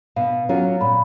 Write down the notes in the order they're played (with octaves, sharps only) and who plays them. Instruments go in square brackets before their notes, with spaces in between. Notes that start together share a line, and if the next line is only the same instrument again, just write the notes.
[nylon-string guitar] B2 [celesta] F5
[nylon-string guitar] F#3 A#3 C#4 F4
[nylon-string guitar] A#2 [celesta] B5